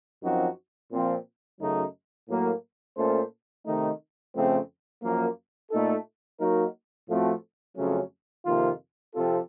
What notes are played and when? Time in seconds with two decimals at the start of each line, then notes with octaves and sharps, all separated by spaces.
0.22 F#2 F3 C4 D#4 F#4
0.91 A#2 F3 C4 F4
1.59 F#2 C#3 F#3 A3 D#4
2.28 A2 F#3 A#3
2.97 A#2 A3 C#4 A4 C5
3.66 C3 D#3 A3 D#4
4.35 F2 C#3 A3 C4
5.02 F#2 F3 A#3
5.71 A#2 A3 D#4 A4
6.40 F#3 A#3 D#4 F#4 A#4
7.08 A2 F3 A3 C4 F#4
7.77 F2 C#3 F#3 A3 C#4
8.45 F2 C3 D#3 A#3 F4
9.14 C3 F3 C4 F4 A4